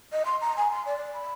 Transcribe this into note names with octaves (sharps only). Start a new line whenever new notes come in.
D#5
C6
A#5
G#5
C6
D5
B5